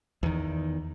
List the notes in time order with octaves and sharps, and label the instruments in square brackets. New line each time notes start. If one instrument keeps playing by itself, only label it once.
[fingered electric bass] E2 D#3